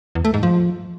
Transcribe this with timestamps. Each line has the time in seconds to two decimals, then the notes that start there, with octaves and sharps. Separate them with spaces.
0.15 E2
0.25 A3
0.34 G#2
0.43 F3